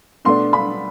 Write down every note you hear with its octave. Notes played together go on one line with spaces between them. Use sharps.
B2 A3 D4 C6
B5